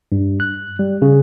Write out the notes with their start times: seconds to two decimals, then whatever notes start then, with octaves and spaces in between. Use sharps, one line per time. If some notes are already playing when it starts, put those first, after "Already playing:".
0.12 G2
0.40 F#6
0.79 G3
1.02 C#3